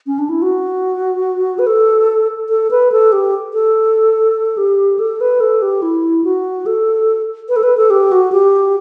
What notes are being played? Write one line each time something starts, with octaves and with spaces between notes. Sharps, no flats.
C#4
D4
E4
F#4
B4
A4
A4
B4
A4
G4
A4
G4
A4
B4
A4
G4
E4
F#4
A4
B4
A4
B4
A4
G4
F#4
G4